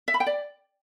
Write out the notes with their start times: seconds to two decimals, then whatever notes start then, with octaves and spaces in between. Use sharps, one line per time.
0.08 E5
0.14 B5
0.20 G5
0.26 D5